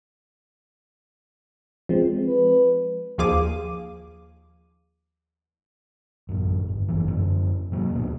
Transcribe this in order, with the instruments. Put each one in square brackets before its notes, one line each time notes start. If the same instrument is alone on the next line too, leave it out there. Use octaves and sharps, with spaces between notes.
[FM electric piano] F3 G#3 C4
[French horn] B4
[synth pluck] D#2 F3 G#4 F5 D6 D#7
[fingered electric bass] A1 F#2
G1
E1 F#2 E3 F3
F#2 D3
C3 F#3 G3 A#3
D#2 B2 F3